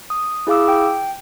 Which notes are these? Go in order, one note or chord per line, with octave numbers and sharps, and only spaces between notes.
D#6
E4 G#4 F5 D6 E6
G5